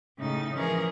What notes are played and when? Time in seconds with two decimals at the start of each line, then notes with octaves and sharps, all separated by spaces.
0.17 A2 C#3 D#4 A6
0.54 E3 F3 C#4 G#4 A#4